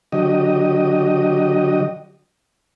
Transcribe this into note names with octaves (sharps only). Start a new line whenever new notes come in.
D3 F#3 G4 D#5